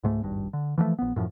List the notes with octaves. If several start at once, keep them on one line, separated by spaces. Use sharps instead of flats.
C#2 G#2 A3
D#1 G#1 G2
D3
E3 F3 G3 A3
A#1 B3
F#2 A2 D#3 F3